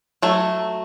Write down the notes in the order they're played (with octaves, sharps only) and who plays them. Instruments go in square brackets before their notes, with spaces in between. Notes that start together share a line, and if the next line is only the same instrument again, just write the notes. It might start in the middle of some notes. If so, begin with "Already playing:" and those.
[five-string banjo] F#3 A3